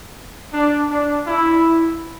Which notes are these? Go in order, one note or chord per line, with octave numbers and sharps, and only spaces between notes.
D4
D4
E4